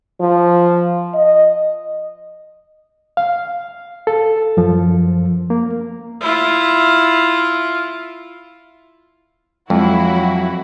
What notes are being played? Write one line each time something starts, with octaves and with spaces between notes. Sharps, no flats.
F3
D#5
F5
A4
F#2 F3
A#3
E4 F4
F2 F#3 G#3 E4 F#4